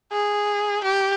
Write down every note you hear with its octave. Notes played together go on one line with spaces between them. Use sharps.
G#4
G4